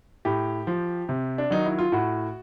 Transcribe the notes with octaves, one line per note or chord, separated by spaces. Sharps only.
A2 G4
F3
C3
D4
D#3 F#3 D#4
E4
F4
A2 F#4